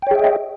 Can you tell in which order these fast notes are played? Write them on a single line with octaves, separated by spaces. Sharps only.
G5 C#5 G#4 E5 D#5